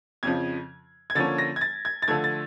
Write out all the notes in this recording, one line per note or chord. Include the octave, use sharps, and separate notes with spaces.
F2 C#3 F3 G#6
G#6
D3 F3 A#3 C#4 A6
A#6
G#6
A6
G#6
A6
D3 F3 A3 G#6
A6